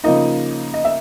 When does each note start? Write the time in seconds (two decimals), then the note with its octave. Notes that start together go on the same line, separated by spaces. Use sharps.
0.04 C#3 F3 A#3 D#4 D#5
0.74 D#5
0.85 E5